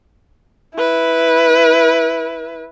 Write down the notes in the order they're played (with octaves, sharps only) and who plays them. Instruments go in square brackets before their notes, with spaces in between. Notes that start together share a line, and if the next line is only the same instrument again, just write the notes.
[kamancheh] E4 B4